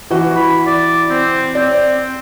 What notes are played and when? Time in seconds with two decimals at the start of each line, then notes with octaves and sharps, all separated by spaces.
0.11 E3 F#4
0.36 B5
0.67 D5
1.10 C4
1.55 C4 D5